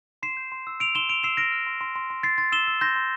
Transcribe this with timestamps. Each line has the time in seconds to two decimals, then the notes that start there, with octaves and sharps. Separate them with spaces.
0.23 C6 C7 E7
0.37 G6
0.52 C6
0.67 E6
0.80 E6 D7 F7
0.95 C6 E7 G7
1.09 E6 D7 F7
1.23 E6 C7 E7
1.37 F6 A#6 D7
1.52 F6
1.67 C6
1.81 C6
1.96 C6
2.10 C6
2.23 C6 A6 C7
2.38 C6 A6
2.52 E6 E7 G7
2.68 E6
2.81 C6 G6 A#6
2.96 C6